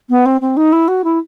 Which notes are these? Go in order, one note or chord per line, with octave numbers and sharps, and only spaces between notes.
B3
C4
C4
D#4
E4
F#4
E4